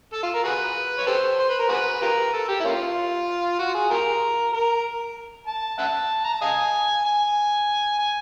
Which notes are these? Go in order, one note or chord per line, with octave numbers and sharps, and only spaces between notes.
A4
F4
A#4
F#4 G#4 B4
C#5
G4 A4 C5
C5
B4
A#4
F#4 G#4 B4
F4 G4 A#4
A4
G4
E4
A#3 C#4 F4
F#4
G#4
F4 G4 A#4
A#4
A5
E5 F#5 A5
A#5
A5
D#5 F5 G#5
G#5
G#5